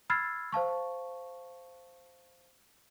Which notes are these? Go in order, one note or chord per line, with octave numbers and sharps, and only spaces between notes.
B5 E6 F6 G#6 A6 C7
C5 F5 A5 C#6